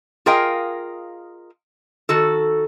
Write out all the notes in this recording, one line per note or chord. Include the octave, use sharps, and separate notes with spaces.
F4 G#4 A#4 D#5 F5 G5
D#3 F#4 A4